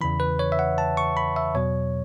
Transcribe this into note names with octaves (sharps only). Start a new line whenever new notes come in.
E2 C#3 E3 B5
B4
C#5
E5
F#5
A5
C#6
B5
E5
E2 B2 F#3 C#5